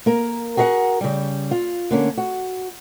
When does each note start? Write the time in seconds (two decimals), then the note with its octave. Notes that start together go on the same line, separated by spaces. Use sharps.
0.06 A#3 A#4
0.57 F#4 G#4 A#4 E5 F#5
1.01 C#3 G3
1.51 F4
1.91 D3 A#3 C#4
2.17 F#4